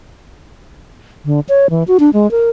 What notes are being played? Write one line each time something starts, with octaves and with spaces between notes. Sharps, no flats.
D3
C#5
E3
F#4
D4
G#3
A#4